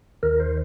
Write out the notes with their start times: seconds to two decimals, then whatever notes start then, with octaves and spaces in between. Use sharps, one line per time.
0.23 D#2 D#3 A#4
0.40 C5